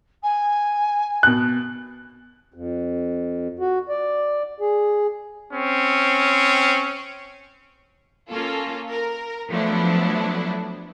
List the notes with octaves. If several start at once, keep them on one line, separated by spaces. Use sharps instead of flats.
G#5
B2 F#6
F2
F#4
D5
G#4
C4 C#4
A#3 C#4 F4 A4
A#4
F3 F#3 A3 B3 D4 E4